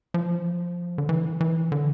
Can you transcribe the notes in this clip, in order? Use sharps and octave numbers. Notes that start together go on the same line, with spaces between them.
F3
D3
E3
E3
D3